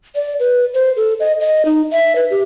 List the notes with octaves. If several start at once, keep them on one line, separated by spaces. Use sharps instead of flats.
D5
B4
C5
A4
D#5
D#5
D#4
E5
B4
G4